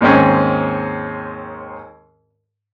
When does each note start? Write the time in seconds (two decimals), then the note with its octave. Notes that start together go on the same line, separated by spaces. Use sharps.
0.01 D#2 G#2 G#3 C4 C#4